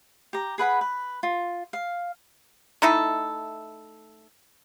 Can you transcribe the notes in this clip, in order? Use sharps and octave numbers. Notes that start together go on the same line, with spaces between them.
G4 A#5
G#4 B4 F#5 B5
B4
F4
F5
A3 D#4 E4 A4